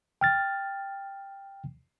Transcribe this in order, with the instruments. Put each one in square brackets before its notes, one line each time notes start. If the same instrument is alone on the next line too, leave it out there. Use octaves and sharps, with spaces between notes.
[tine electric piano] G5 F6 A6